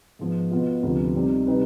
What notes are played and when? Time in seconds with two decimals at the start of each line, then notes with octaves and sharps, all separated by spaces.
0.19 G#2 F3 B3
0.51 B2 B3 F4
0.83 D2 C3 F3 B3 F4
1.15 F2 C3 G3 C4 D#4
1.47 C3 G3 C4 D#4 B4